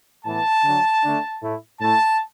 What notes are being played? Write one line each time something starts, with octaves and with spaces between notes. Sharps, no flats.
A2 E3 B3 A5
D3 F#3 D4
D3 A3 D4
A2 A3 E4
A2 A3 E4 A5